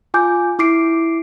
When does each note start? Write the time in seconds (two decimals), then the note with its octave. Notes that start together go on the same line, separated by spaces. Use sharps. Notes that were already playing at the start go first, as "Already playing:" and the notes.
0.14 F4 G#5 D6 G6
0.59 E4 D6 C7 D7